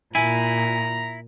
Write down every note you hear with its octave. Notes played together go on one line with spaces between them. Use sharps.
A#2 E4 G#5 A#5